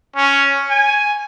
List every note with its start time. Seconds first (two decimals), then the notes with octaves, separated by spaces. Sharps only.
0.16 C#4
0.70 G#5